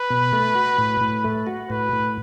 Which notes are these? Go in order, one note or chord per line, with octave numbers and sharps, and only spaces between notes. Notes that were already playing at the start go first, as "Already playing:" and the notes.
Already playing: B4
B2
A3
F#4
A2
A2
A3
F#4
A2 B4
A2